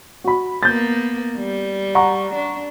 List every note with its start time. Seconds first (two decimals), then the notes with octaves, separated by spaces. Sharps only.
0.24 F#4 B5
0.63 A#3 B3 G6 A6
1.37 G3
1.95 F#5 A#5 C#6
2.35 D4